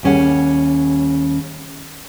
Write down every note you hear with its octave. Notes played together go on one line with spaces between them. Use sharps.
D#2 G3 C#4 G#4 F#5